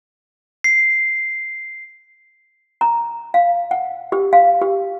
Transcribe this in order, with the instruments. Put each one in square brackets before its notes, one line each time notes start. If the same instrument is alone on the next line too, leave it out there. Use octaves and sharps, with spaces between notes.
[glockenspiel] C7
[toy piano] A#5
F5
F#5
G4
F5
G4